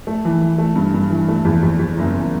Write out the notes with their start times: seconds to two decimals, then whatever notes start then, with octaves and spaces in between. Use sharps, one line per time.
0.07 A3
0.25 E3
0.41 E3
0.58 A3
0.76 G2
0.94 G2
1.10 E3
1.28 A3
1.45 E2
1.63 E2
1.79 E2
1.98 F#1
2.15 F#1